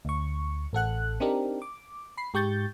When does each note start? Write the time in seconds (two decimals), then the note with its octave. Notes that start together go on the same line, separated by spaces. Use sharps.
0.05 D2 C#6
0.73 A1 A4 F#5 F#6
1.20 C4 D4 D#4 G4 A#4
1.62 D6
2.17 B5 C7
2.34 G#2 G4 C#6 G6 A6